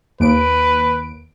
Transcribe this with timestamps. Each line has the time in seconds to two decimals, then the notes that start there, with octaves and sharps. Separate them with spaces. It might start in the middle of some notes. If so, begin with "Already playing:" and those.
0.20 D#2 B4 D7